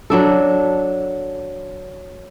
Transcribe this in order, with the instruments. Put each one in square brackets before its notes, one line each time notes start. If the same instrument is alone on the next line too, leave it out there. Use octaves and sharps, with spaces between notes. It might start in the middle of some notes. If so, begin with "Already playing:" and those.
[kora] F#3 D4 A4